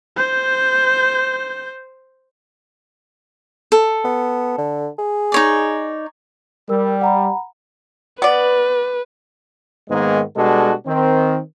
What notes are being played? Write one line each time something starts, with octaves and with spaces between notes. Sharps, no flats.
C5 G6
A4
B3
D3
G#4
D#4 C#5 D5
G3 A#4 E6
F#5 A#5 B5
B3 B4 D5
G#2 D#3 G#3 A#3 B3
B2 G3 G#3 D4 F#4 A4
D#3 C4